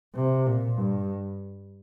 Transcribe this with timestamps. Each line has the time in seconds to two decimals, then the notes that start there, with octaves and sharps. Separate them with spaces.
0.15 C3
0.46 A#2
0.78 G2